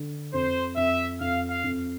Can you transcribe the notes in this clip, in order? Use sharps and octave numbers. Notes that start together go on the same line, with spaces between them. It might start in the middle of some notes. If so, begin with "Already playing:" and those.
Already playing: D3
F2 C5
F2 E5
F2 F5
F5
F2